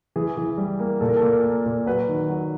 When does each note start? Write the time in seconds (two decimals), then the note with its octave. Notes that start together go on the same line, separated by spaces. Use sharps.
0.16 E3 G#4
0.37 E3
0.58 G3
0.79 A#3
1.01 A#2 A4
1.09 A#4
1.16 A4
1.23 A#2
1.44 A#3
1.66 A#2
1.86 F#3 B4
2.09 D#3
2.29 F#3